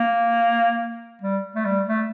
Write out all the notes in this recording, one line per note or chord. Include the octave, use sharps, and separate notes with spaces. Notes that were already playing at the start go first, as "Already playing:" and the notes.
Already playing: A#3
G3
A3
G3
A3